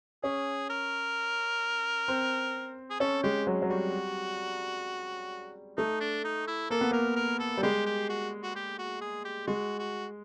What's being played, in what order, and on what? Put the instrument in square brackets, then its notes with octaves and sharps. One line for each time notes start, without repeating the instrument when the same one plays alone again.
[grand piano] C#4 [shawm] G#4
[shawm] A#4
[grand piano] C4
[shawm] G#4
[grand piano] C#4 [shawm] A4
[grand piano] G#3 [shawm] G4
[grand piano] F#3
F#3
[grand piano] G3 [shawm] F#4
[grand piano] A3 [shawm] D#4
[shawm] D4
D#4
E4
[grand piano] A#3 [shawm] A4
[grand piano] B3
[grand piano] A#3 [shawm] A#4
[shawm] A#4
A4
[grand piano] G3
[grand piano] G#3 [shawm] G4
[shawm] G4
F#4
F#4
G4
F#4
G#4
G4
[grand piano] G#3 [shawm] F#4
[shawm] F#4